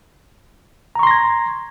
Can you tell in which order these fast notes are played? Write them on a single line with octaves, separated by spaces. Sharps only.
A#5 C#6 C6 A#6 G#6